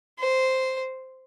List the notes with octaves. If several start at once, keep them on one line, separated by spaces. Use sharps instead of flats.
C5